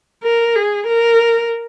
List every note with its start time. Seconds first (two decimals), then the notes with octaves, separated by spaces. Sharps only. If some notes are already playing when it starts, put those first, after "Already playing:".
0.23 A#4
0.56 G#4
0.87 A#4